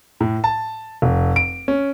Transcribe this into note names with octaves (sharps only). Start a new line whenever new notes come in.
A2
A5
F1
D7
C#4